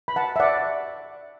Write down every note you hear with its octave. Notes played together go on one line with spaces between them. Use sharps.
B5
F#5 A5
E5
D5 F#5